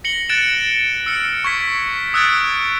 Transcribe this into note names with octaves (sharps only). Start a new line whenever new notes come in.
A#6 C#7 F#7 G7
F#6 A6 D7 E7
E6 F6 C#7
C#6 G#6 B6
D#6 E6 F#6 G#6 A6 D7